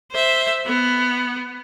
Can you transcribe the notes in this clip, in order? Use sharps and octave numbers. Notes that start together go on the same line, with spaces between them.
C5 E5
B3